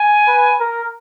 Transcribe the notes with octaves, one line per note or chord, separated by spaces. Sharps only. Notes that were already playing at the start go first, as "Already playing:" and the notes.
Already playing: G#5
B4
A#4